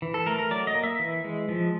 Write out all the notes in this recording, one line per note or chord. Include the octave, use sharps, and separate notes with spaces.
E3
A4
A3 A#4
A#4
F#3 D5
D#5
A#3
E5
E3
G#3
F3